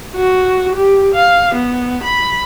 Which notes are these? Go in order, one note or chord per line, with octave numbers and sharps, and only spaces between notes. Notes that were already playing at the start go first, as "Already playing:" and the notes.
F#4
G4
F5
B3
B5